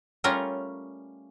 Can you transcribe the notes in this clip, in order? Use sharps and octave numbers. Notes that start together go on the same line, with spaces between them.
G3 A3 C#4 F4 A#4